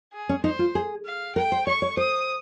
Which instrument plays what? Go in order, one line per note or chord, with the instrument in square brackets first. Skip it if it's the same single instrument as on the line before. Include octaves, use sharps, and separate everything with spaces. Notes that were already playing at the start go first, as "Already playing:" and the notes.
[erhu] G#4
[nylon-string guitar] C#4
[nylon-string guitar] D#4 [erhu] C5
[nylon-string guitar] F4
G#4
[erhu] F5
[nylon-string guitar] A#4 [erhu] G5
[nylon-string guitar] C5
[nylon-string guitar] C#5 [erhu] C#6
[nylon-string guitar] C#5
[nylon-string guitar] C5 [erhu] D#6